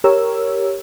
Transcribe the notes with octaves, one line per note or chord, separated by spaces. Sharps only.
G4 A#4 C#5 E6